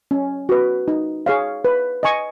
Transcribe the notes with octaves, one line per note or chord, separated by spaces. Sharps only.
C#4
F#4 B4
D#4
G#4 C#5 F5
B4
D#5 G#5 C#6